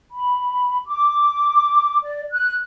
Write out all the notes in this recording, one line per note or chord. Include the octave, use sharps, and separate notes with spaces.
B5
D6
D5
F#6